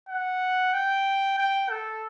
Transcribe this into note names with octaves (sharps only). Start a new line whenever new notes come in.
F#5
G5
G5
A4